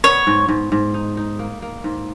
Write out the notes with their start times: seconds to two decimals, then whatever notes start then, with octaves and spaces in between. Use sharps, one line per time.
0.04 B3 C#5
0.27 G#2
0.49 G#2
0.72 G#2
0.94 D#4
1.17 D#4
1.39 A#3
1.62 A#3
1.84 G#2